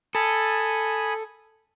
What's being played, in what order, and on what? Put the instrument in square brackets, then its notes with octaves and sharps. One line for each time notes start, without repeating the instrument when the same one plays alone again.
[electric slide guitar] A4 [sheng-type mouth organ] G#5 B5 D#6